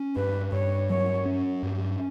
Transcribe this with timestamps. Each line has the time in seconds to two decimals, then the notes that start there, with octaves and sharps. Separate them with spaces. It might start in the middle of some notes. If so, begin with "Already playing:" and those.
Already playing: C#4
0.16 G2 B4
0.52 G2 C#5
0.90 F#3 C#5
1.26 C#4
1.63 G2